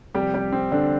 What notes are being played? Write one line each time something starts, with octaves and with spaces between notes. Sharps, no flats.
C2 C3 F3 G3 G4
G3 G4
C4
D3 D4